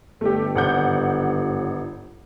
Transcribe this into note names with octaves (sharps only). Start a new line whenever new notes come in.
G1 A3 G4
G#1 F#5 G6